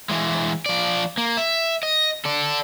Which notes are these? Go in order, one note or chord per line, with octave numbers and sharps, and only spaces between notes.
E3 G#3
F3 D5
A#3
E5
D#5
A4 D5